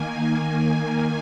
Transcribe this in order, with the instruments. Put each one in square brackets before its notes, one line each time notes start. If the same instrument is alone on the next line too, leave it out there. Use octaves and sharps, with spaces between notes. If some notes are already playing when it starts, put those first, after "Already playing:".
Already playing: [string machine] D#3 A#3 G#5